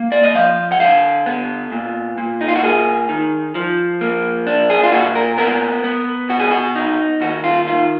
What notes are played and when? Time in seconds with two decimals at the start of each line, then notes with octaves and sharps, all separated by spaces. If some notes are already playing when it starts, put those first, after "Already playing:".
Already playing: A#3
0.12 D5
0.23 D#5
0.35 F3 F5
0.72 F#5
0.80 D3 F5
1.26 B3
1.72 A#2
2.18 A#2
2.41 D#4
2.48 F4
2.56 F#4
2.63 A#3 G#4
3.09 D#3
3.55 F3
4.01 A#3
4.47 D4
4.70 G#4
4.83 F4
4.92 A#2 F#4
5.15 A#4
5.38 B3 A#4
5.84 B3
6.30 B2 F#4
6.40 G#4
6.51 F#4
6.75 D#4
7.21 D#2 F#4
7.44 F4
7.67 D#3 F4